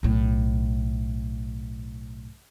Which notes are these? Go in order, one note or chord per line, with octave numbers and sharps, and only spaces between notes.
B1 A2